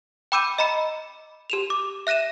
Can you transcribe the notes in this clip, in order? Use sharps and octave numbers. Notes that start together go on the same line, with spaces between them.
G5 B5 D6 E6 G6 D#7
D#5 A#5 B5 C#7
G4 E7 F7
D6
E5 F#6 A#6 D#7 E7